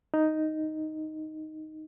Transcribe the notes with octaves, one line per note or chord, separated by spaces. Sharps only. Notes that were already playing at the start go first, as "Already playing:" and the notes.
D#4